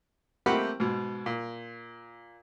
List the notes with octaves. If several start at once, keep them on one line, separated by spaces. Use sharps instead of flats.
A3 A#3 C4 G4 F#5 B5
G#2 B2
A#2